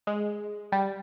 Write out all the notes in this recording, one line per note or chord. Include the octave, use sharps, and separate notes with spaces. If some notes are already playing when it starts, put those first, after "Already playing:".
G#3
G3